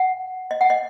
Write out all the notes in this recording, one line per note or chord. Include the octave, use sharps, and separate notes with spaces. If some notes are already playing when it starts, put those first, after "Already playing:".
Already playing: F#5
D#5
F#5
D#5